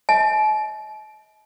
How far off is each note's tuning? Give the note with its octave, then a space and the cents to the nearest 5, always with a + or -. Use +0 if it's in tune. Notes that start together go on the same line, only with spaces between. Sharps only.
D#5 +45 A5 -45